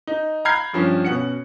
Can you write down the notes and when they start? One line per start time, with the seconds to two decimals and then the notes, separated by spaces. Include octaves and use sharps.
0.07 D#4
0.45 A#5 B5 F6 G6 G#6 C7
0.73 G2 F3 C#4
1.05 B2 C#4 F#5 C#7